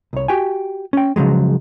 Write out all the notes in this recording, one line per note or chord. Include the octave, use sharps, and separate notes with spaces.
C2 C#5
F#4 G4 G5 G#5
C#4 G5
C#3 F3 F#3 G#3